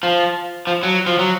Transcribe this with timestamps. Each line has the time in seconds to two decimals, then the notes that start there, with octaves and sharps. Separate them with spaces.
0.03 F3
0.67 F3
0.83 F#3
1.07 F3
1.19 F#3